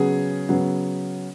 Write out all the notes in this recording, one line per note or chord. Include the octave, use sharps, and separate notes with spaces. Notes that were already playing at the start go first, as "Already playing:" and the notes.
Already playing: C#3 F#3 B3 G#4
C#3 F#3 B3